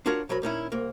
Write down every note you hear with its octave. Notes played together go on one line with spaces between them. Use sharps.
D4 F4 F#4 A#4 C#5
C2 F#3 A#4 B5
A#2 D#3 C#4 E4
C2 A#3